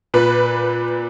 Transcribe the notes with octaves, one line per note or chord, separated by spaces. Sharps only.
A#2 B4